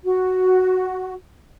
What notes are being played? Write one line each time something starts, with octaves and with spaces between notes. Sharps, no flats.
F#4